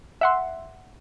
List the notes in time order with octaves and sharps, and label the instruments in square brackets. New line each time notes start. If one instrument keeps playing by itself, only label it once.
[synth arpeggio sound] E5 F#5 C6